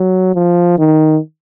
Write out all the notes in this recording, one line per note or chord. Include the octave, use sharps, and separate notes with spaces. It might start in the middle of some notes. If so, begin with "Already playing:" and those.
Already playing: F#3
F3
D#3